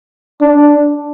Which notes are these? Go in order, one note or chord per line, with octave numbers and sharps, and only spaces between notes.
D4